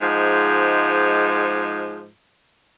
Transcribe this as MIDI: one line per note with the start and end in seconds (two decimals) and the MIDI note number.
0.01 2.08 44
0.01 2.08 53
0.01 2.08 56